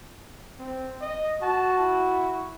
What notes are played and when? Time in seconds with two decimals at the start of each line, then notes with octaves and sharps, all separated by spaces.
0.59 C4
1.01 D#5
1.42 F#4 A5
1.78 E4